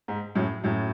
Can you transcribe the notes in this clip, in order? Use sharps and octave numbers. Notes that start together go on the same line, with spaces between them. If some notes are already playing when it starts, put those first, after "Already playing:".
G#2
F#2 A2
F#2 A2